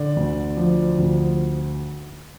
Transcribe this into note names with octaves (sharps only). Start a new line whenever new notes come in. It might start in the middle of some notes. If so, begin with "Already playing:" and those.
Already playing: D3 D5
D2
F3
D2